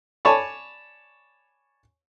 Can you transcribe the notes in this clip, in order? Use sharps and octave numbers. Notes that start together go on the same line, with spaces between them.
C#5 D5 G#5 A5 B5 C#6